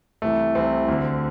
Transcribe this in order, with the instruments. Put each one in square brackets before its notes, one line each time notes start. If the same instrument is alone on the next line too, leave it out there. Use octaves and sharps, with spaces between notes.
[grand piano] C2 C3 E3 A3
C2 C3 E3 C4
D2 D3